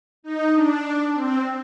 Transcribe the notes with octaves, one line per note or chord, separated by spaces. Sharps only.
D#4
D4
C4